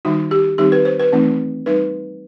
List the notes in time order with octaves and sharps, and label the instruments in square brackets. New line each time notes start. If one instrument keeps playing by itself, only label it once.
[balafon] D#3 G3 D#4 F#4
G4
D#3 G3 C4 D#4 G4
B4
C5
B4
E3 A3 C4 D#4
G3 D#4 B4